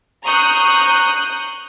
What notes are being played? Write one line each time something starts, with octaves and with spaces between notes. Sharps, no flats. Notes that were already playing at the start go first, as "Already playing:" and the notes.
A#5 C#6 D#6 F#6 G6 C7